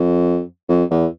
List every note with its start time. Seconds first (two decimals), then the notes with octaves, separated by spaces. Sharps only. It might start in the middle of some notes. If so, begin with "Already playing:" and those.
Already playing: F2
0.69 F2
0.91 E2